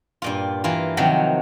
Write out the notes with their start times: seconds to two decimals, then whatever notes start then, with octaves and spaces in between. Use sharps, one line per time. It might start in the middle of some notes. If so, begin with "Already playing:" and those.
0.22 G2 A#2 F4
0.64 E3 A#3 F4
0.97 C3 D#3 F3 F#3